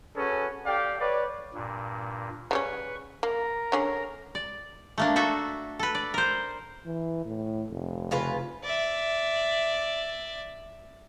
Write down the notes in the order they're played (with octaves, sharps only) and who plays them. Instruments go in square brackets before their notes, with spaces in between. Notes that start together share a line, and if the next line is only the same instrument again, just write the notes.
[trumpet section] C#4 F#4 G#4 A4 B4
G4 A4 D5 F5 G5
B4 C#5 D5
[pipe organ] G2 A#2
[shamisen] C#3 G3 C#4 [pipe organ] B4 C#6
[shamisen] A#3 [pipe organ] A#4 A#5
[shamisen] D3 C#4 G#4
[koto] D5
A3 A#3 D4
F#4 A4 E5
A4 B4
D5
A#4 C5
[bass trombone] E3
A2
F1
[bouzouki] C#3 F4 B4
[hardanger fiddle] D5 E5